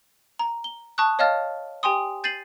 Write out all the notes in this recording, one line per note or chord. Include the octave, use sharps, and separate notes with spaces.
A#5
G7
A5 C#6 D#6 F#6
C#5 D#5 F5 A5 F6 A6
G4 G5 G#5 C6 D#6
G6 A6 C7 D#7 F#7